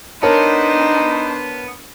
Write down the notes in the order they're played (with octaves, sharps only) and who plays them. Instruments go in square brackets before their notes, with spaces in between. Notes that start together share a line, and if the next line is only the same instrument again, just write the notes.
[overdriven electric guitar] B3 [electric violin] D4 C5 [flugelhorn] D#4 [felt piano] A#4 C#5 A5